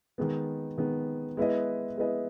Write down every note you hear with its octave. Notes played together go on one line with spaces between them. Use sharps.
D#3 G#3 B3
D#3 G#3 B3
G#3 B3 E4 B4 D#5
G#3 B3 E4 B4 D#5